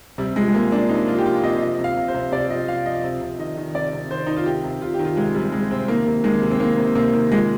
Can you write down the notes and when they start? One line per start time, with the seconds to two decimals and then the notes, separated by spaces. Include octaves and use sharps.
0.18 C3 G3
0.36 F3 G#3
0.48 G#3
0.54 C3 A#3
0.72 F3 D4
0.89 C3 D#4
1.07 F3 F4
1.18 G4
1.25 F3 F4
1.43 C3 D#5
1.61 F3 D#5
1.79 C3
1.84 F5
1.97 C3
2.08 C5
2.14 C3
2.32 C3 D5
2.50 F3 D#5
2.68 F3 F5
2.86 F3 D#5
3.04 C3
3.21 C3
3.39 D#3 D#5
3.57 D#3
3.74 C3 D5
3.93 C3
4.10 D#3 C5
4.27 D#3 D#4
4.36 F4
4.46 C3 G4
4.64 C3
4.82 C3 F4
4.94 G4
4.99 D#3
5.05 F4
5.17 C3 G#3
5.34 C3 G3
5.52 C3 G#3
5.71 C3 C4
5.88 D#3 A#3
6.07 C3
6.24 D#3 G#3
6.42 C3
6.51 C4
6.60 D#3 A#3
6.78 C3
6.95 C3 A#3
7.13 D#3
7.31 A#2 G#3